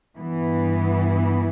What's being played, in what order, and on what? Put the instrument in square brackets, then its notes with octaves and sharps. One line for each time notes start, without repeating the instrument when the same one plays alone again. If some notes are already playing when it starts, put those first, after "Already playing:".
[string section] G2 E3 B3